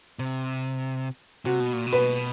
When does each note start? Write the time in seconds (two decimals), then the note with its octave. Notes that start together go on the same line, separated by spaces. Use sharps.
0.19 C3
1.45 C3 F#4
1.60 B2
1.73 A#2
1.87 B2
1.93 B4